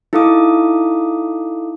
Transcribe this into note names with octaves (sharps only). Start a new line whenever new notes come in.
D#4 E4 A4 F5 D6 D#6